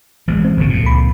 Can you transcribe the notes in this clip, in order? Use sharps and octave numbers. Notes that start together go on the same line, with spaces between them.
A1 E3 G#3
C4
G1 A2 C#3
F2 A#2
C#2 B5